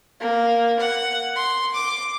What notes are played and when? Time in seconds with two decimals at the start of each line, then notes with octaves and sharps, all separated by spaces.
0.20 A#3
0.79 F#5
1.36 C6
1.74 D6